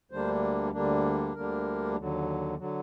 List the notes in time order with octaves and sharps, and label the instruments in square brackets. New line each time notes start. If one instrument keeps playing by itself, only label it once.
[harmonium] D2 D3 G3 A#3 D4 C5
D2 D3 G3 A#3 D4
D2 D3 G3 A#3 D4 A#4
D#2 D3 F#3
D3 F#3